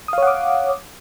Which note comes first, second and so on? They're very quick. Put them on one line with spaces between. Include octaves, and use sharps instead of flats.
D#6 F5 C#5 F#5 D6